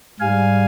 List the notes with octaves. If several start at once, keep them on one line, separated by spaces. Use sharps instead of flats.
G#2 G3 F5 G#5